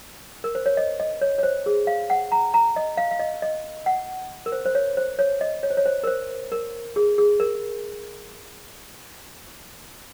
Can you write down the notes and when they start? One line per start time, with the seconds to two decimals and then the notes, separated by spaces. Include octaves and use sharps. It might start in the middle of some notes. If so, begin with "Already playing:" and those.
0.44 A#4
0.55 C5
0.66 C#5
0.77 D#5
1.00 D#5
1.21 C#5
1.38 C#5
1.43 C5
1.66 G#4
1.87 F5
2.10 F#5
2.32 A#5
2.54 A#5
2.76 D#5
2.97 F5
3.11 F5
3.20 D#5
3.42 D#5
3.86 F#5
4.46 A#4
4.52 C5
4.65 C5
4.75 C#5
4.97 C5
5.19 C#5
5.41 D#5
5.63 C#5
5.70 C5
5.77 C#5
5.86 C5
6.03 A#4
6.07 C5
6.52 A#4
6.96 G#4
7.18 G#4
7.40 A#4